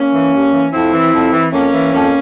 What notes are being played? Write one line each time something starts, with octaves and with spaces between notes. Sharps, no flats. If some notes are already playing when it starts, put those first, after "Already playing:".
Already playing: A#3 C#4
E3
G2
E3
F2 C4 E4
E3
F2
E3
F2 A#3 C#4
E3
F2 A#3 C#4